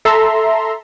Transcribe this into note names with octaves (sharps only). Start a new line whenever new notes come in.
A4 E5 A#5 C6